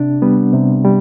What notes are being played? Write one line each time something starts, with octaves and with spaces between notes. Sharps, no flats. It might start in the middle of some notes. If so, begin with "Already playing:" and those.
Already playing: C3 D4
G3 B3
C3
G3